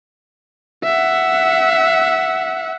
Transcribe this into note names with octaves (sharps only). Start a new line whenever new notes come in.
E5 F#5